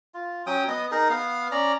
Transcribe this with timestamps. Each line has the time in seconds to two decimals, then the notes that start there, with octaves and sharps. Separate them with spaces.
0.14 F4
0.47 F#3 C#4 G5 D#6
0.68 B3 D#5
0.92 D#4 G#4 A#4
1.10 B3 F5
1.52 C#4 D5 A#5